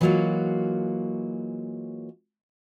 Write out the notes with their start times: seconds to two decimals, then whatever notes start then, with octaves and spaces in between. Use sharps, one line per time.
0.01 E3 F#3 G#3 A#3 F4 F#4